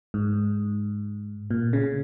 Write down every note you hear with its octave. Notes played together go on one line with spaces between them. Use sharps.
G#2
A#2
C#3